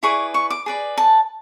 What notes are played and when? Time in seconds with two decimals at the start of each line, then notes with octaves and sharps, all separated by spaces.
0.03 E4 G#4 B4 D5 C#6
0.34 C#6
0.50 D6
0.66 G#4 B4 D5
0.98 A5